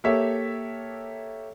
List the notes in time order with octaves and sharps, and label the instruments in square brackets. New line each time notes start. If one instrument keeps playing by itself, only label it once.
[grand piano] A#3 G4 A4 C#5 E5